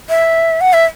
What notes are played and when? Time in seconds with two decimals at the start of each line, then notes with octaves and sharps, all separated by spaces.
0.09 E5
0.61 F#5
0.73 E5